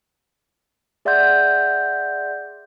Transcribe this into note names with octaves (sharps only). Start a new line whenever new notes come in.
G#4 D5 E5 F#5 C6 G6